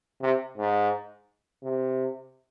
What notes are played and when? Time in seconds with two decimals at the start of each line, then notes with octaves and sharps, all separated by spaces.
0.21 C3
0.57 G#2
1.63 C3